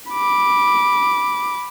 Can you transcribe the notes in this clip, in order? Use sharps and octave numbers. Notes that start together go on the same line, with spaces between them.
B5 D6